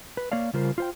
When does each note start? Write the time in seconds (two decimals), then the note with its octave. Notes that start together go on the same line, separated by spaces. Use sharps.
0.17 B4
0.32 A#3 C#5 D5 F5
0.53 C#3 G3 F4 A#4 C5
0.78 F4 C5 G5